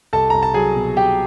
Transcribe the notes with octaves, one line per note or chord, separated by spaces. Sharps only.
C2 A4 A5
C2 A#5
A5
F#3 G#4 G#5
B2
C2 G4 G5